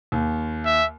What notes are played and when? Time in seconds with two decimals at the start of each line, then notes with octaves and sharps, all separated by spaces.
0.12 D#2
0.65 E5